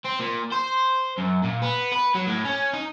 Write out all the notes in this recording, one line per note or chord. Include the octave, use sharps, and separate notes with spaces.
C4
A#2
C5
F#2
A#2
B3
B4
F#3
A2
C#4
D#4